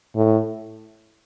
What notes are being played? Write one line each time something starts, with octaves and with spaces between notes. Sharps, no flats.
A2